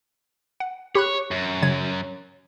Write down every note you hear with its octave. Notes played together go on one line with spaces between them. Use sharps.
F#5
G4 C#5 B5 F#6
F#2
C#3 F#3 G#6